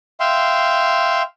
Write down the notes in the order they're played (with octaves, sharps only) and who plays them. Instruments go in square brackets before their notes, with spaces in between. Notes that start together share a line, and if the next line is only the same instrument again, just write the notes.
[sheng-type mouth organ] E5 F5 G5 C6